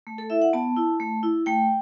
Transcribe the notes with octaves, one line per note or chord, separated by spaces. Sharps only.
A3
A4
E4 E5
F#5
B3 A5
E4
A3
E4
A3 G5